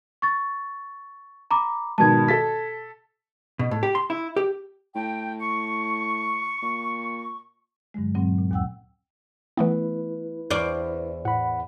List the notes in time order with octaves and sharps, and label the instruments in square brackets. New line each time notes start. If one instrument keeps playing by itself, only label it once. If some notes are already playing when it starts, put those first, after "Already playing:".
[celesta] C#6 A6
A#5 B5 D6
[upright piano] G#2 B2 D#3 [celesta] A5 G#6
[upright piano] A4 A6 B6
[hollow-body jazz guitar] B2
A2
G4
C6
E4
G4
[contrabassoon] A2 [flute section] G5
[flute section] C#6 [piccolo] C#7
[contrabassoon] A#2
[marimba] G2 D3 F#3 G#3
G2 A#2 F#3 C4
A#2
D#2 A#2 F#5 G5 E6
[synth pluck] E3 A3 B3 [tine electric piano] E4 B4
[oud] E2 C5 D5 [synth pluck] C#6 F6
[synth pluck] A2 [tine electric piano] F#5 B5